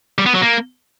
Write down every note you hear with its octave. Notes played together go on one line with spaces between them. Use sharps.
G3
B3
F#3
A#3